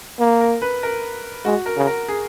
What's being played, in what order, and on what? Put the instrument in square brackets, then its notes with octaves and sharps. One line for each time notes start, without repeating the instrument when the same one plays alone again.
[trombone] A#3
[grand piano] A#4
B4
A#4
[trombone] G#3 [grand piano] F#4
[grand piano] A#4
[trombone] C#3
[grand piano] A#4
G#4